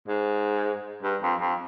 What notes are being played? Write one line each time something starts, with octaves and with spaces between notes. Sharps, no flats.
G#2
G2
F2
F2